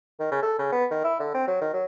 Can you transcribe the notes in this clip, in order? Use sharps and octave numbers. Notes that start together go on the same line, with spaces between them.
D#3
C#3
A4
C#3
B3
D#3
E4
D3
C4
F#3
D#3
F#3